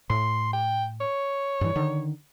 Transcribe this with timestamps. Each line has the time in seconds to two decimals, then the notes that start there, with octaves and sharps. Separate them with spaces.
0.10 A2 C6
0.53 G5
1.01 C#5
1.61 G2 E3
1.76 D3 D#3